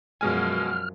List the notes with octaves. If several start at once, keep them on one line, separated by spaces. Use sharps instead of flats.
F#2 B2 F3 F#3 G#3 G#5 F6